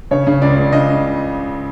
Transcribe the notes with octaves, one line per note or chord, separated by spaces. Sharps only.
C#3 C#5
C#3
C#2 D5
C#2
C#3 D#5